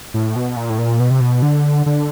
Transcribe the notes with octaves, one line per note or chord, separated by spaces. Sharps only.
A2
B2
A#2
A2
A#2
B2
C3
B2
D3
D3